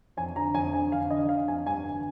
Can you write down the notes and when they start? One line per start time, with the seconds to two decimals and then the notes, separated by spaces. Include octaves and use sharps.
0.17 F2 G#5
0.36 D3 A#5
0.54 F2 G#5
0.73 D3 G#5
0.92 F2 F5
1.11 D3 D#5
1.29 D3 F5
1.48 F2 G#5
1.66 G2 G#5
1.86 D3